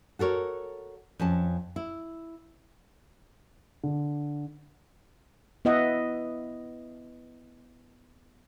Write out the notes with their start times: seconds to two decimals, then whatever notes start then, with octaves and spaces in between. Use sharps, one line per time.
0.19 F#4 A4 A#4 C#5
1.19 F2 C#4 A5
1.76 E4
3.83 D3
5.65 B3 E4 D#5 E5 F#5